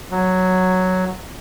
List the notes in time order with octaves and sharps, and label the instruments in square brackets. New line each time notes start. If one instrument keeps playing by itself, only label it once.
[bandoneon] F#3